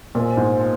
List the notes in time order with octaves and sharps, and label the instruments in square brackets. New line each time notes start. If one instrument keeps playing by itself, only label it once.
[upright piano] A#2 [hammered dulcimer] F3 G#3 C4
[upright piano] G#2
[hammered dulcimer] F3